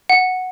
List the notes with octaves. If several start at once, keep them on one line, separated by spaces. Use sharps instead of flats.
F#5